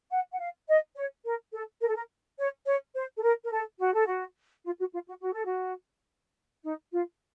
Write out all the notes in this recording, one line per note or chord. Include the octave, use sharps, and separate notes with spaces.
F#5
F#5
F5
D#5
C#5
A#4
A4
A#4
A4
A#4
C#5
C#5
C5
A4
A#4
A#4
A4
F#4
A4
F#4
F4
F#4
F4
F#4
F#4
A4
F#4
D#4
F4